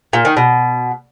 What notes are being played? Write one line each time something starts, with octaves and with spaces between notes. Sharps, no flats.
A#2
D#3
B2